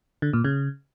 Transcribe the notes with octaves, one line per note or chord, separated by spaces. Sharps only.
D3
A#2
C#3